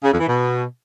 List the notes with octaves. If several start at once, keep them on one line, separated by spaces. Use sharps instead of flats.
C#3
F2
E3
B2